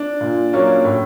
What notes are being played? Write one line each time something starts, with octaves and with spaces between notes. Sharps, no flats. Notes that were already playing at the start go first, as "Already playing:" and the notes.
Already playing: D4
A#2
F#3 A#3 C#4
A2